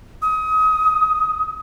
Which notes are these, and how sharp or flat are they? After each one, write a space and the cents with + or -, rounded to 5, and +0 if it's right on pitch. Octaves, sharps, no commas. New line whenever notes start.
D#6 +30